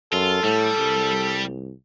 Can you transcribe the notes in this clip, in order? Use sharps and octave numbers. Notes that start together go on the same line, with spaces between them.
F#2 F4 A4
A2 G3
C2